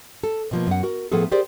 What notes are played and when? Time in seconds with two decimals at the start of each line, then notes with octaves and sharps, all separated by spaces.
0.24 A4
0.51 B2 F3 A#3
0.67 F#2 F#5
0.83 F#4 A#4
1.12 A2 F3 B3 G#4 A4
1.32 G4 G#4 A#4 C5 D5